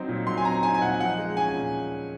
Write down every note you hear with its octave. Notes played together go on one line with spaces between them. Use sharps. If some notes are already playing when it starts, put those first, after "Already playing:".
Already playing: F#3 C4 D#4
A#2
F#3 C6
G#5
C4 A#5
D#4 G#5
G#5
A#2 F#5
F3 F#5
G#3
C#4 G#5
A#2